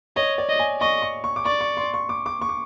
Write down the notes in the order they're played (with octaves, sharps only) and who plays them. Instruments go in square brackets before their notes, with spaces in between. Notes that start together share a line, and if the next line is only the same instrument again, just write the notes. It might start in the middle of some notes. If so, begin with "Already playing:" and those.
[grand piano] C#5 [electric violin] D#5
[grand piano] D5
[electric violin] D#5
[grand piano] G#5
[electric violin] D#5 [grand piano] C#6
[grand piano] C#6
C#6
D6
[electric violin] D5 [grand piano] C#6
[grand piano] C#6
C6
C#6
D6
D6
C#6
D6